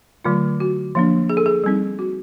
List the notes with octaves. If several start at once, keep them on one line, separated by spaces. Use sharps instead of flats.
D3 F#3 A3 F4
F#4
F3 A#3 D4
G#4
A4
G#4
G3 C4 D#4
F#4